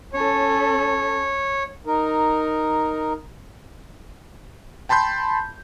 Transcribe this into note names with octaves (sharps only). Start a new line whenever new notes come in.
C#4 A4 C#5
D#4 A#4
G5 A5 B5 C6 G6